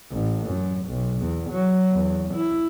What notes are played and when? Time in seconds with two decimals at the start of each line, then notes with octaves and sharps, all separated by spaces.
0.11 A1
0.48 F#2
0.87 B1
1.22 E2
1.51 F#3
1.92 E2
2.35 E4